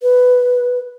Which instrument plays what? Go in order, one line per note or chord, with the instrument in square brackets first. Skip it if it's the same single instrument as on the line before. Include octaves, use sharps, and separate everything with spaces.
[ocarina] B4